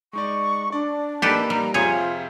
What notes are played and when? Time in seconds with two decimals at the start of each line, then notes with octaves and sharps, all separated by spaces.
0.13 G#3 D#4 D5 C#6
0.72 D4 D5
1.22 A#3 D#4 G4 A4 B4 D5
1.50 G3 A#5
1.74 F2 C3 F4 G#4 C#5 G6